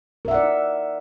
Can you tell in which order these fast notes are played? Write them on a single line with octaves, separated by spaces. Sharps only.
A#4 E5 F#5 D5 D#4